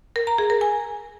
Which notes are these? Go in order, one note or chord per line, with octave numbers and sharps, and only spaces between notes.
A#4
A#5
G#4
A#4
G#5